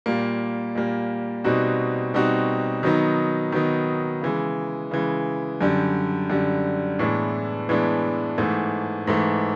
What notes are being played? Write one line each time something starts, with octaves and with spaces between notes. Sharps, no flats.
A#2 G3 A#3
A#2 G3 A#3
B2 G3 C4 D#4 F#4
B2 G3 C4 D#4 F#4
D#3 F#3 B3 D#4
D#3 F#3 B3 D#4
C#3 E3 G#3
C#3 E3 G#3
F#2 D3 G3
F#2 D3 G3
A2 E3 G#3 B3 D4
A2 E3 G#3 B3 D4
G#2 E3 A3
G#2 E3 A3